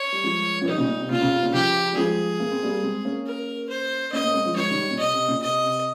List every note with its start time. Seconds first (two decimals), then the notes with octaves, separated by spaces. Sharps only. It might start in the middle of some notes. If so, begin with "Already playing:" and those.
Already playing: C#5
0.12 G3
0.24 F3 G#3
0.61 F3
0.67 D#3 G3 D#4
0.78 A#2 C#3
0.89 A#2
1.00 C3
1.10 A#2 C#3 F4
1.21 A#2 C#3
1.32 C3
1.43 A#2 C#3
1.50 D#3
1.54 C#3 F3 G4
1.93 G3
1.97 F3 G#3 G#4
2.40 A#3
2.51 C4
2.63 G3 A#3
2.83 G#3 C4
3.05 A#3 C#4
3.26 A#4
3.70 C5
4.12 A#3 C#4 D#5
4.23 A#3 C#4
4.34 G#3 C4
4.45 F3 G#3
4.56 F3 G#3 C#5
4.70 D#3 G3
4.90 A#2
4.99 C3 D#5
5.14 C3
5.28 A#2 C#3
5.42 C3 D#5
5.64 C3